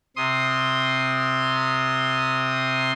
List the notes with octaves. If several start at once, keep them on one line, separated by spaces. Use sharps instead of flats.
C3 C6 D#6